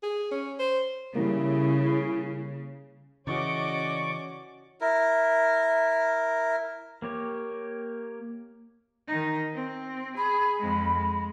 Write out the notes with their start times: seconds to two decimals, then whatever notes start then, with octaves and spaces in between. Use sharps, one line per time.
0.03 G#4
0.31 C#4
0.59 C5
1.15 C#3 G3 A#3 E4
3.27 C#3 E3 C#4 F#4 D5 D#5 C#6 D6
4.81 E4 A#4
7.02 A#3 G4 C#5
9.07 D#3 D#4
9.54 C4
10.17 G#4 B5
10.59 F2 G#3
10.93 G#3